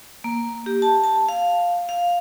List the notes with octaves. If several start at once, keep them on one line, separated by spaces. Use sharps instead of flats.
A#3
G4
A5
A5
F5
F5